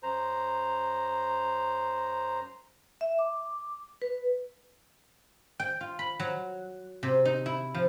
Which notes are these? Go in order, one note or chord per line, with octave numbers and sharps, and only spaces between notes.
F#2 C5 A#5
E5
D6
B4
G5
F4
B5
F#3
C3
D#4
E4
F3